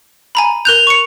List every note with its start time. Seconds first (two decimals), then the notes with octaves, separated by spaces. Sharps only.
0.35 G#5 A#5 B5
0.65 A#4 F#6 G6 F7
0.87 C#6 C#7